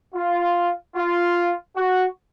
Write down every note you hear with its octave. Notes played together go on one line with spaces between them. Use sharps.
F4
F4
F#4